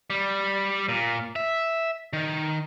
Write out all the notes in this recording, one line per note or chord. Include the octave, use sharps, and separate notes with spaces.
G3
A#2
E5
D#3